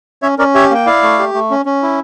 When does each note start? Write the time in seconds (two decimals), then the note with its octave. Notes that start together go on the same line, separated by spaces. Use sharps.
0.22 C#4 C#5 E5
0.38 C#4 A#4 D5
0.55 G4 C#5 E5
0.70 A#3 G5
0.86 E4 D5 F5
1.03 A3
1.19 G4
1.34 A3
1.51 C#4
1.66 C#4
1.83 E4